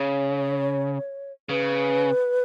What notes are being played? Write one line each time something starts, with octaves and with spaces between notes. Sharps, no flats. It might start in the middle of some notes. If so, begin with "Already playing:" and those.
Already playing: C#3 C#5
C#3 B4